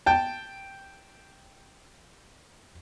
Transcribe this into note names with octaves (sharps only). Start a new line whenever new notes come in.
G5 A5